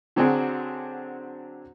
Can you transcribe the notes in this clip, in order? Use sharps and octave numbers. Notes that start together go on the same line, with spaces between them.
D3 F#3 C4 D4 F#4 G#4